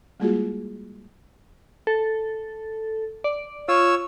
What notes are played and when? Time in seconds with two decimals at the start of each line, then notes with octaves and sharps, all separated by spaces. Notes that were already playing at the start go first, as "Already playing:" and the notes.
0.20 G3 G#3 A#3 F4 F#4 G#4
1.87 A4
3.24 D5
3.68 F4 C#5 E6